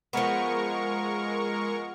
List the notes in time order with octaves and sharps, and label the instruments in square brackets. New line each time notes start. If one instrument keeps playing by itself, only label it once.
[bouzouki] F3 B3 [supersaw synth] G#3 A#4 C#6